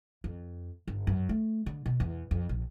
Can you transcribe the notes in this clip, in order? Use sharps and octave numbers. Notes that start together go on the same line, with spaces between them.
F2
G1
F#2
A3
D3
B2
E2
F2
A#1